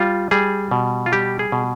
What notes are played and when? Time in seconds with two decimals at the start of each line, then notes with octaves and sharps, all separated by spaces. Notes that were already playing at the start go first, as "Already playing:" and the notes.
Already playing: G3 F4
0.31 G3 G#4
0.71 B2
1.06 F4
1.12 G3 G4
1.39 G#4
1.52 B2